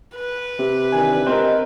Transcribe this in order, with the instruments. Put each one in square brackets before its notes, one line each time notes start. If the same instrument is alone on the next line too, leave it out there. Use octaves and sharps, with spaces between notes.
[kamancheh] B4
[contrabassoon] C3
[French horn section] D#3 E3 D4 [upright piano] G#5
[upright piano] C4 A#4 [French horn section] G4 C5 D#5